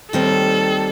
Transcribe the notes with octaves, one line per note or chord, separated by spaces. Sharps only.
D#2 D#3 G3 C4 A4